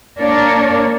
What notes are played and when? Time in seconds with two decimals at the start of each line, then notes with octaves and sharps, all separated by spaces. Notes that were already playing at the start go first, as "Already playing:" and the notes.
0.19 A#3 D4 A#4 C#5 D5